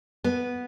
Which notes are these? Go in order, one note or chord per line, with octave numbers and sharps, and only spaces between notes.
B3